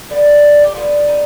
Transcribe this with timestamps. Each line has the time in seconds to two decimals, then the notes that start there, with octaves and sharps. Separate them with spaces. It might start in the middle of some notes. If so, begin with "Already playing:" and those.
0.11 D3 G3 B3
0.64 G4
0.75 D3 G3 B3 F4
1.08 D#4